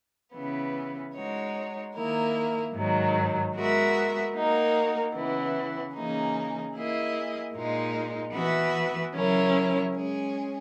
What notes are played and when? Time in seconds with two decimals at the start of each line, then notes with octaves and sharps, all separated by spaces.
0.34 C#3 E3 B3
1.15 G#3 D#4 F#4 C#5
1.95 D#3 A#3 E4 A#4
2.74 G#2 D#3 F#3
3.55 G#3 B3 F#4 A#4 E5
4.34 A#3 D#4 F#4 A#4
5.14 C#3 E3 B3 E4
5.94 C#3 E3 A#3 D#4 G#4
6.75 A#3 E4 G#4 D#5
7.55 A#2 G#3 D#4
8.34 E3 B3 F#4 B4 E5
9.14 C#3 F#3 C#4 E4 A#4
9.95 G#3 C#4 G#4